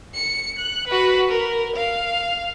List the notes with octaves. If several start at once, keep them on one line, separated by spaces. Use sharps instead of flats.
C#7
F#6
F#4 B4
A#4
F5